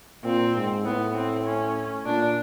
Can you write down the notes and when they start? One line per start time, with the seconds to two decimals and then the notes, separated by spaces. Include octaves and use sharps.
0.24 A#2 C4
0.56 G#2
0.85 A2 B3
1.15 C4
1.45 C#4
2.06 A#2 D4